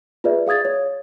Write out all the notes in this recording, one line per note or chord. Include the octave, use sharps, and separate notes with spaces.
F4 G#4 B4 D5 E5
G#4 F5 D#6 G#6 A6
C#5